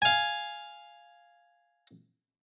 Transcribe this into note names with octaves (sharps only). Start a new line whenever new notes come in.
F5 G#5